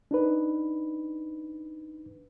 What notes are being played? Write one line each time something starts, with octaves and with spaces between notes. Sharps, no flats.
D4 D#4 B4